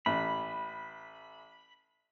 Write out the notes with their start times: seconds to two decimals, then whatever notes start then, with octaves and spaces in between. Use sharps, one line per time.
0.06 A1 B5